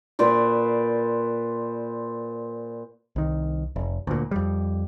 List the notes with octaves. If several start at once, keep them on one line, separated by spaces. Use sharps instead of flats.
A#2 B4 C5 D5
C2 D#3
F1
D2 A#2
F2 G3